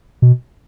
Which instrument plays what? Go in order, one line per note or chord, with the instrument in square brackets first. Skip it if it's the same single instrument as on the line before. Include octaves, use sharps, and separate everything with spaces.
[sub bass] B2